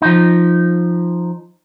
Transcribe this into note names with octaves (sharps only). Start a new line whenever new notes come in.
F3 D#4